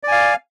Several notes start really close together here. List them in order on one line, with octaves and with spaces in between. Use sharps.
D5 G#5 F5